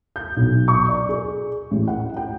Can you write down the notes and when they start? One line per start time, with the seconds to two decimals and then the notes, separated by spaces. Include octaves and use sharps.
0.16 G6
0.37 B1
0.68 C#6
0.88 D5
1.09 G#4
1.71 A1
1.88 F#5
2.16 G5